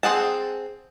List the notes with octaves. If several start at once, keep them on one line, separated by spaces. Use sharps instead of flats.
C4 G#4 F#5 A5